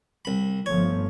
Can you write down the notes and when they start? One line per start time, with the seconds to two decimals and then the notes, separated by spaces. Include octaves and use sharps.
0.25 C2 B5
0.66 G1 F3 A3 C#5